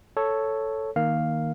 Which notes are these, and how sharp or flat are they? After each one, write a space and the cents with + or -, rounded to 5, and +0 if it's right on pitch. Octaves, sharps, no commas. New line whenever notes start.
A4 +0 C#5 +0
D#3 +0 A#3 +0 F5 +0